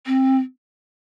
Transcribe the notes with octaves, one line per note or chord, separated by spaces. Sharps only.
C4